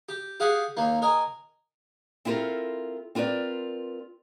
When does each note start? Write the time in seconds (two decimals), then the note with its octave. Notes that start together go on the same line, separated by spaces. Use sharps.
0.09 G4
0.40 G4 G#4 F5 F#5
0.77 D#2 A#3
1.02 A#4 D#5 G#5
2.25 C4 E4 F4 A4 A#4
3.15 C4 F4 A#4 B4 D5